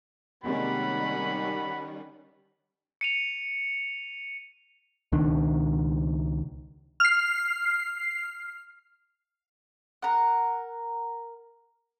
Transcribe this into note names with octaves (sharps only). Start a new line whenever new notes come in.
C3 D#3 G3 G#3 A#3 C#4 F#5 B5
C#7 D#7 F7
C#2 B2 D#3 D4
F6 C7
A#4 F#5